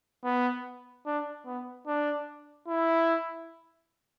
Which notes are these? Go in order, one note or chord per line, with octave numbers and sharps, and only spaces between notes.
B3
D4
B3
D4
E4